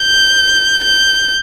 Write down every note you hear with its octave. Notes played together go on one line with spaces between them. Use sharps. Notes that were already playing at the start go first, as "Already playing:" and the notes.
Already playing: G6
G6